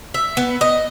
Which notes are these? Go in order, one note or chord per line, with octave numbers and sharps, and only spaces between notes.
E5
B3
D#5